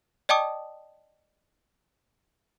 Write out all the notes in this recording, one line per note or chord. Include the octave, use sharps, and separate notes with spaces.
D5 D#5 G5 A5 D6 D#6